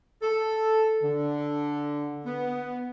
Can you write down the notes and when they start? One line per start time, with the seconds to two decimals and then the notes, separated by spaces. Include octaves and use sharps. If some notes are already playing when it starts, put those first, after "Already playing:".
0.22 A4
1.02 D3
2.26 B3